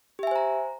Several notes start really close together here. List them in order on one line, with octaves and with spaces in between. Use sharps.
G4 E5 G#5 C5 A#5